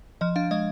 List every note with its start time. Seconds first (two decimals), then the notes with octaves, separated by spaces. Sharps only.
0.21 F3 D#5
0.36 D4 F5
0.51 G#3 D#5